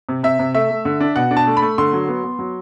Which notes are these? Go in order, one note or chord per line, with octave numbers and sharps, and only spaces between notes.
C3
C3 E5
C3
A3 E5
A3
D3
D4
B2 F#5
D4
A5
A3
B5
A3
D3 C6
F#3
B3
B3
F#3